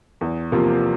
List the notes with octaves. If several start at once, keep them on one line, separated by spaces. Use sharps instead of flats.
E2
C3 F3 A#3 F4